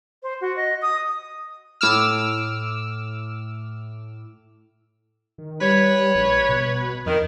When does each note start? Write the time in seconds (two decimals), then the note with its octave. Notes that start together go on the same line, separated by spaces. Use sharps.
0.23 C5
0.41 F#4
0.56 D#5
0.82 D#6
1.81 A2 D6 E6 F6
5.38 D#3
5.61 G3 B4 C#5
6.15 A#1
6.49 B2
7.06 F2 D#3